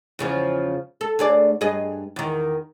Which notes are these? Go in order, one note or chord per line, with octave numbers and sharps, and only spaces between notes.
E2 C#3 F3
A4
D2 G#4 D5
G2 G#4 D#5
E2 D#3